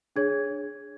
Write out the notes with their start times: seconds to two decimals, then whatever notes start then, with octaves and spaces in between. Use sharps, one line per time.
0.16 D4 G#4 C#5 G#6